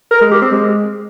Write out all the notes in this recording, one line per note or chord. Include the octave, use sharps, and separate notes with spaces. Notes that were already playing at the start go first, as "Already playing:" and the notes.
A#4
G#3
G4
C4
G#3